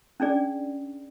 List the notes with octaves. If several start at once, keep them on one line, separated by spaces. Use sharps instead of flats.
C#4 D4 G#4 D5